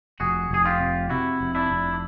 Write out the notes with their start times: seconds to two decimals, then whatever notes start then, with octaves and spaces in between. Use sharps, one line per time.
0.20 F1 F#4 G#4
0.51 F1 G#4
0.65 F4 G4
0.80 C3
1.10 C3 E4 F#4
1.40 F1
1.55 D4 E4
1.70 F1